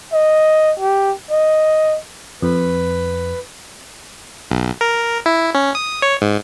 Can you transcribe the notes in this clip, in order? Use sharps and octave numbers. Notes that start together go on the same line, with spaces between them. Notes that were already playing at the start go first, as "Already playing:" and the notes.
D#5
G4
D#5
F2 B4
B1
A#4
E4
C#4
D#6
C#5
G#2